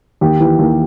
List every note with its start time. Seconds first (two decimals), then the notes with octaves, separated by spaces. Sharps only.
0.21 D#2 G4
0.40 E3
0.59 D#2